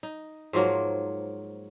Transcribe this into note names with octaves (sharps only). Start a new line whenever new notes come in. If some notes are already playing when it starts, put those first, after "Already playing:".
D#4
G#2 F3 F#3 A#3